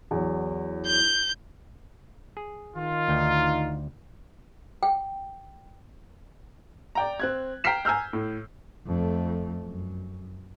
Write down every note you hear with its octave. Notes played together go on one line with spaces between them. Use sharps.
E2 F#3
G6
G#4
D#3 D#4 F4
D2 G5
G5
D5 G5 A#5
C4 F#6 G#6
G5 A#5 F6 B6 C7 E7
G#5 A#5 E6 F6 G6
A2
F2 A3
F#2